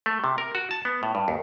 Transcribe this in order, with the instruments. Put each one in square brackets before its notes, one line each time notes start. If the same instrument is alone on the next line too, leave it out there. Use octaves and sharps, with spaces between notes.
[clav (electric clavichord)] A3
C3
A#4
F#4
A5
B3
A2
G2
D#2